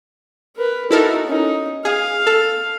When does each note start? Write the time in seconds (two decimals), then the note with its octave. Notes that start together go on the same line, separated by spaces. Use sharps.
0.56 A#4 B4
0.91 D#4 E4 F#4 A4 A#4
1.27 C#4 D#4
1.85 G#4 F5
2.27 A4